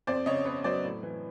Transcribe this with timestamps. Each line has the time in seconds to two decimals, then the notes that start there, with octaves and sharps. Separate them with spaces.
0.07 F2 C5 D5
0.26 C#3 C#5 D#5
0.45 B3 B4 C#5
0.64 F#3 C5 D5
0.84 A2
1.03 E3